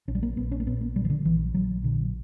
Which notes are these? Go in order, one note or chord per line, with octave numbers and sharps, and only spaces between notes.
A#1 C#4
G3
A#3
A#1 B3
C#4
A#3
A#2 B3
A#3
A#2 G3
E3
D3
A#1 E3
A#1 F#3
A#2 D3